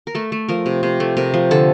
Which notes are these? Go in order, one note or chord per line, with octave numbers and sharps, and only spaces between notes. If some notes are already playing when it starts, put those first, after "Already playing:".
A#4
A3 A4
A3
F3 A#4
C3
C3 C5
A3
C3 A#4
F3
D3 A4